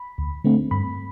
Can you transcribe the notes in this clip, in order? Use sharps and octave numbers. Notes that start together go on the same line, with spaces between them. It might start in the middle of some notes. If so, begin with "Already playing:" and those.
Already playing: B5
D2
D3 A3 C4
G2 B5